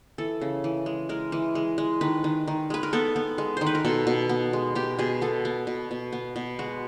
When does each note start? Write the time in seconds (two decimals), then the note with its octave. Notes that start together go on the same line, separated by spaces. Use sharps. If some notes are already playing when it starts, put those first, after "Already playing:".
0.18 E3 A4
0.41 C#3
0.64 E3
0.86 G#3
1.09 G#3 A#4
1.32 E3
1.55 G#3
1.78 G#3
2.01 D#3 B4
2.24 D#3
2.48 D#3
2.70 G#3 B4
2.83 A#4
2.93 B3 A4
3.16 B3
3.38 G#3
3.57 D#3 C5
3.67 B4
3.75 A#4
3.85 B2 A4
4.07 B2
4.29 B3
4.53 G#3
4.75 B2 G4
4.99 B2 G#4
5.21 B3 A4
5.45 B3
5.67 B2
5.91 B2
6.12 B3
6.36 B2
6.59 G#3 F#4